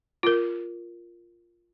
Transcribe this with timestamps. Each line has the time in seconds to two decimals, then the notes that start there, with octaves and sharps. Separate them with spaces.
0.23 F4 A#4